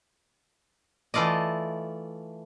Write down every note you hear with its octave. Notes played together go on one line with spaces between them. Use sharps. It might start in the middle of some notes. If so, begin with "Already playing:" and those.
E3 A3 F4 D5 D#5